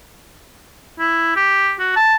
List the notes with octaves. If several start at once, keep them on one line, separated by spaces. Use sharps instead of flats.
E4
G4
F#4
A5